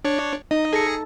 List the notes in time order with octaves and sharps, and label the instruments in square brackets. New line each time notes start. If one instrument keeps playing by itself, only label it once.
[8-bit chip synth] D4 C#5
[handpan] D#4 [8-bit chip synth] D#5
[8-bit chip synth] G#4 A#6 C#7 [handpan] A4